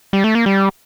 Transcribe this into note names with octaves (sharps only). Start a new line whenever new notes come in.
G3
A3
A#3
G3